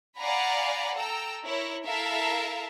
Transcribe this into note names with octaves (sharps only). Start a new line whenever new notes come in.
D5 F5 F#5 G#5 A#5 B5
A4 G5 A#5 E6
E4 A#4 C#5
E4 A4 A#4 E5 F5 A5